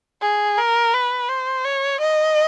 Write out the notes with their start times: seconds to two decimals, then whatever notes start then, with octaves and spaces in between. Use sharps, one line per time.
0.22 G#4
0.58 A#4
0.94 B4
1.29 C5
1.64 C#5
2.00 D#5